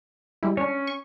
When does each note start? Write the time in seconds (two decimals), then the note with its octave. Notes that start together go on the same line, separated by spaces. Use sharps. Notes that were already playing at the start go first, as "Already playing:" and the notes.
0.43 G3 G#3 E4
0.57 C#4 D4 C#5
0.87 C#6